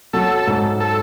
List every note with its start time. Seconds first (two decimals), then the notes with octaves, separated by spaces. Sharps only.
0.13 F#3 A4
0.47 G#2
0.80 A4